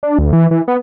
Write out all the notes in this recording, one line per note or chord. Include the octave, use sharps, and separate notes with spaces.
D4
D2
E3
E3
B3